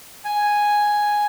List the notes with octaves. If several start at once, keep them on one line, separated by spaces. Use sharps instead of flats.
G#5